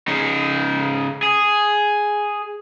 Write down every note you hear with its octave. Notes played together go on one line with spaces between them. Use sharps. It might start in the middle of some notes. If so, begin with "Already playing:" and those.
C#3 D#4
G#4